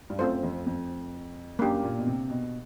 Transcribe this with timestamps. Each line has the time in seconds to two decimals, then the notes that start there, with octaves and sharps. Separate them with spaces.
0.10 G2
0.19 F#2 A3 C4 F4 A4 C5
0.43 F2
0.66 F2
1.59 F#2 A#3 D4 G4
1.83 A#2
1.98 B2
2.07 C3
2.30 B2